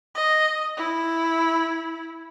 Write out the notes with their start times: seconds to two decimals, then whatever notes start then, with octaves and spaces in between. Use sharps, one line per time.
0.15 D#5
0.77 E4